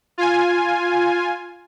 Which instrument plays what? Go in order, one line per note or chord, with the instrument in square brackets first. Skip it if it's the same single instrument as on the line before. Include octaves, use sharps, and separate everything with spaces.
[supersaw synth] F4 G#5